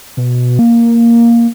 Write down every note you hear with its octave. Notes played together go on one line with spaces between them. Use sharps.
B2
A#3